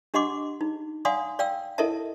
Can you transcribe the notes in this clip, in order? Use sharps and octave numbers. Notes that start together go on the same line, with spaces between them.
D4 G4 D#5 F#5 C6 D6
D#4
D5 F5 F#5 G#5 C6 D#6
D5 F5 G5 E6
E4 A4 A#4 D#5 E5 A5